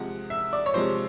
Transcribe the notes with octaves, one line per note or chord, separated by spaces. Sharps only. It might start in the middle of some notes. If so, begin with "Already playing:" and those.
Already playing: C3 F3 G#3 F#5
E5
D5
C#5
C3 F3 G#3 C5